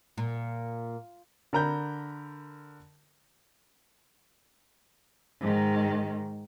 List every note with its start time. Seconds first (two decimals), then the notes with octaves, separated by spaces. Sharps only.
0.18 A#2
1.53 D3 A#4 A#5 B5 G6
5.40 G#2 D#3